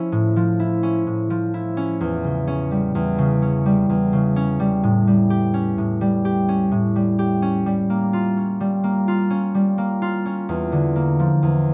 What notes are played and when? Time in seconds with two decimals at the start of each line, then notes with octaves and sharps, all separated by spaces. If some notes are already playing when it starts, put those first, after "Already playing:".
Already playing: F3 C#4 E4
0.12 A2
0.36 F3
0.60 E4
0.83 C#4
1.07 A2
1.30 F3
1.54 E4
1.77 C#4
2.01 E2
2.24 C#3
2.47 C#4
2.71 G3
2.95 E2
3.19 C#3
3.42 C#4
3.66 G3
3.89 E2
4.13 C#3
4.36 C#4
4.60 G3
4.83 A2
5.07 G3
5.30 G4
5.54 C#4
5.78 A2
6.01 G3
6.25 G4
6.49 C#4
6.72 A2
6.96 G3
7.19 G4
7.42 C#4
7.66 G3
7.90 A#3
8.13 F4
8.37 C#4
8.60 G3
8.84 A#3
9.08 F4
9.30 C#4
9.55 G3
9.78 A#3
10.02 F4
10.26 C#4
10.49 E2
10.72 D3
10.96 A#3
11.19 F3
11.43 E2